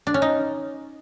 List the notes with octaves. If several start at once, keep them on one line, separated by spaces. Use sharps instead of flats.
D4
C#4
D#4